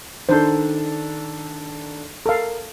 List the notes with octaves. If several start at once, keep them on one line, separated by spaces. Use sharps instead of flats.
D#3 D4 A4 C5
A4 A#4 F5